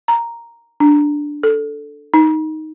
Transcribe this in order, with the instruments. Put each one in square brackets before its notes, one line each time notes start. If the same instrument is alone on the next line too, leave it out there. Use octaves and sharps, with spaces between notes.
[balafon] A#5
D4
A4
D#4